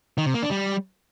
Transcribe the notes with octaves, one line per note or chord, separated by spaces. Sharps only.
D#3
C3
A#3
D4
G3